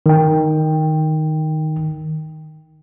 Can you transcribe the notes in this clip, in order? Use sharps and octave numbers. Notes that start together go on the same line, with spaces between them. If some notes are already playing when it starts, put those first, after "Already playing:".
D#3 G5